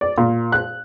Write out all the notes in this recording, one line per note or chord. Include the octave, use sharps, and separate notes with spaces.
D5
A#2
F#6